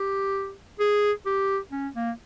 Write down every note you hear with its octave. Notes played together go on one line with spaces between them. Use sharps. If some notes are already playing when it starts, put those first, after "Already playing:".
Already playing: G4
G#4
G4
C#4
A#3